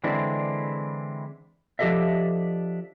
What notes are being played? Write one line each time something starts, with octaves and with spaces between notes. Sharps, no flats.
D3 E3 G#3 C4 D4 E4
F3 D4 G4 A4 D#5 E5